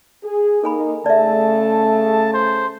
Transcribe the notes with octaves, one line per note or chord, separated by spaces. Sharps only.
G#4
A#3 D#4 A4 G#5 B5
C#3 A3 D5 E5 A5
C5